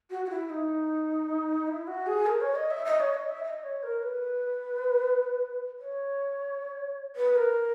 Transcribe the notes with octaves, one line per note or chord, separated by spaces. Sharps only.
F#4
F#4
E4
D#4
E4
F#4
G#4
A#4
C#5
D#5
E5
D#5
C#5
D#5
E5
D#5
C#5
A#4
B4
C#5
B4
A#4